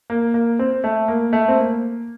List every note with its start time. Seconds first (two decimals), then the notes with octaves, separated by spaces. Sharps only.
0.10 A#3
0.34 A#3
0.59 C4
0.84 A3
1.08 A#3
1.33 A3
1.48 C4
1.58 A#3